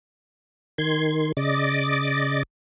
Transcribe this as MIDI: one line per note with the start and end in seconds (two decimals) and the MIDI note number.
0.78 1.32 51
0.78 1.32 84
0.78 1.32 92
1.37 2.43 49
1.37 2.43 74
1.37 2.43 75
1.37 2.43 86